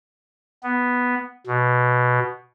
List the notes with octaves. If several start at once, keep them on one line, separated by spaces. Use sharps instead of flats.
B3
B2